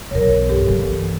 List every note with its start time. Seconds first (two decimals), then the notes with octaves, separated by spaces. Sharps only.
0.11 B1 E2 A#4 C#5
0.49 G2 G4 A4
0.68 E3 A#3